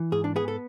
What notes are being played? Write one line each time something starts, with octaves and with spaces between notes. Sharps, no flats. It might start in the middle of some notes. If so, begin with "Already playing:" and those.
Already playing: E3
G#2 G#4
D4
B3 G#4
A4